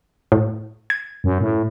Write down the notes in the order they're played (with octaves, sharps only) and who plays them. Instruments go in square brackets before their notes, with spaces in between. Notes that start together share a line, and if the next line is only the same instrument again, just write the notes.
[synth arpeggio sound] A2
G#6
[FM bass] F#2
A2